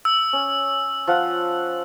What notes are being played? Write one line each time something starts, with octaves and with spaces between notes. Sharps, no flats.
E6
C#4
F3 F5 F#5